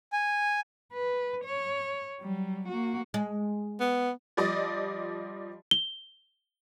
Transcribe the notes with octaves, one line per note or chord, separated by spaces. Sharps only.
G#5
B4
C#5
F#3 G3
A#3 F#4
G#3
B3
F3 G3 D5 D#5
G7